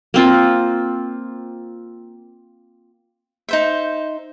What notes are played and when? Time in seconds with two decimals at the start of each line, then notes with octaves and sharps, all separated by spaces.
0.14 A#3 C4 F4
3.49 D#4 C5 E5